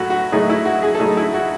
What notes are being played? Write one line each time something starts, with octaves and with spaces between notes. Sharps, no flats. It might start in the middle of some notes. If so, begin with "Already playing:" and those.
Already playing: A2 F#3 A3 F#4
F#4
A2 F#3 A3 D#4 G#4
E4
F#4
G#4
A4
A2 F#3 A3 D#4 G#4
E4
F#4